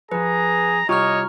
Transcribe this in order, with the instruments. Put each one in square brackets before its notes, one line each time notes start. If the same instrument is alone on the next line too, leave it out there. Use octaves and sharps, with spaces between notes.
[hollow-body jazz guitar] F2 F3 [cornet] G#4 [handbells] B4 [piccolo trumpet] A#5
[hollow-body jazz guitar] C2 F4 G4 [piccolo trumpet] C#5 [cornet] D#5 [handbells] A#5 C#6 F6